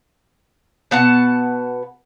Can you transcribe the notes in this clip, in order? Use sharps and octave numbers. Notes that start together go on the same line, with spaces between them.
B2 B3 F#5 A5